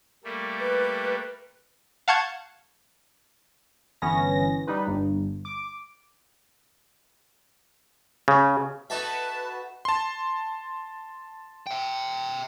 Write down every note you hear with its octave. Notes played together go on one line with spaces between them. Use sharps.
G3 A3 A#3
B4
F5 F#5 A5 C#6 G6 G#6
G1 E3 B3 C#4 A#6
G3 D#4 B4
G1 G2
D6
C#3
D#4 F#4 A4 B4 E5 A5
A5 C6
E5 G5